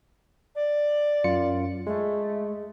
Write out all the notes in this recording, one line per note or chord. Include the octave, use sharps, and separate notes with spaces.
D5
F#2 F4 C#7
G#3 A3